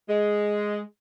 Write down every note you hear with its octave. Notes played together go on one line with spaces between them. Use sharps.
G#3